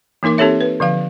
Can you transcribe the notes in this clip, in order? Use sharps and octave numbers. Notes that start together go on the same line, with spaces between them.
E3 A#3 D#4 A#4 D6
C4 D#4 G4 A4 C#5 E5
B4
D3 F3 F5